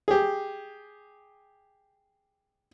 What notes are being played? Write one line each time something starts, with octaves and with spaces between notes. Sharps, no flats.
G4 G#4